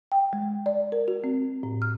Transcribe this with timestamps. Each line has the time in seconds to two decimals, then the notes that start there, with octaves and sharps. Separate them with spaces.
0.12 G5
0.33 G#3
0.66 D5
0.92 A#4
1.08 F#4
1.24 C4
1.63 A2
1.82 F6